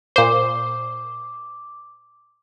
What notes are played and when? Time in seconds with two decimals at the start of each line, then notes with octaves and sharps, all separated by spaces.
0.16 A#2 C5 D6